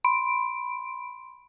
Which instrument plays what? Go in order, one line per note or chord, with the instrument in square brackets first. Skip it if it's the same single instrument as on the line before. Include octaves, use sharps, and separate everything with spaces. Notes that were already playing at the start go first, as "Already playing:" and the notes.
[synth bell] B5 C6 D7